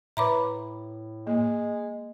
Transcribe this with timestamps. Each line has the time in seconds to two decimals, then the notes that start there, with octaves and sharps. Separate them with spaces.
0.17 A2 B4 C#5 E5 A#5 B5 D6
1.27 G#3 A#3